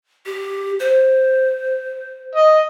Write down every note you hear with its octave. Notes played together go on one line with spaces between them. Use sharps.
G4
C5
D#5